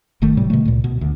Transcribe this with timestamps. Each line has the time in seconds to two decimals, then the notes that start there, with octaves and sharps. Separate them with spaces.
0.22 G1 D#3 A3
0.37 A2 C3 G3
0.50 B2 D3 A3
0.65 C#2 A#2
0.84 B2
1.01 D2